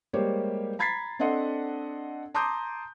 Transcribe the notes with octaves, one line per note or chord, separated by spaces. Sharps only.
G3 G#3 A#3 G4 C5 C#5
A#5 B5 G#6 A6 B6 C7
C4 D4 A4 D#5 F#5 C6
A5 A#5 C6 D6 D#6 G6